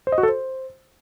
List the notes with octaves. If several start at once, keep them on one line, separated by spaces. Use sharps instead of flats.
C5
D#5
F#4
A4
C5